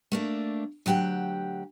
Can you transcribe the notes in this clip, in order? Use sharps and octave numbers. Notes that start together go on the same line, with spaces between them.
A3 A#3 D4
D2 F#3 G4 F#5 G5